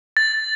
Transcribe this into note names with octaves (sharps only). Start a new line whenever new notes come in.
A6